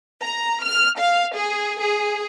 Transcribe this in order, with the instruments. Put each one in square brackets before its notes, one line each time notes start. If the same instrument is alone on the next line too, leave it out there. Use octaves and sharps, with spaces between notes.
[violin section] A#5
F6
F5
G#4
G#4